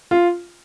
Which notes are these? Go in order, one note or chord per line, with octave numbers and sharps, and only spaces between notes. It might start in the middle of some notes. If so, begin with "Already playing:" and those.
F4